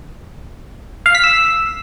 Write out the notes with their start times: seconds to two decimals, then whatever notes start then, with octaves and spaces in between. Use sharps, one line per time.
1.06 F5
1.15 B6
1.24 E6